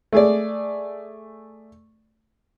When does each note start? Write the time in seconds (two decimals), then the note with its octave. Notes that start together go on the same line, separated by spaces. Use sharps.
0.13 A3 G#4 D5